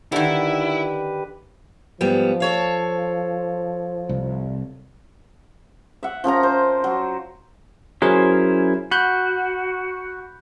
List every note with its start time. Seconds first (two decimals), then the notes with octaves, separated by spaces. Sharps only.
0.12 D3 D#3 E4 G4 B4
2.01 G#2 F3 G3 B3
2.40 A4 C#5 F5
4.09 C2
6.03 E5 F#5
6.24 F3 C#4 A#4 A#5
6.43 C5
6.84 F#3
8.02 F#3 C#4 E4 G#4 A#4 C5
8.91 F#4 B5 F#6 G6